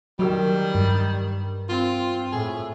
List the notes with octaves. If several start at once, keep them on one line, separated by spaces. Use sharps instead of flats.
D#3 F#3 G3
G2
C4 F4
A2 G#4